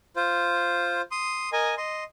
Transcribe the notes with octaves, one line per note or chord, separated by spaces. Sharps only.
F4 C5
C6 D#6
A#4 D#5 G#5
D#5 C6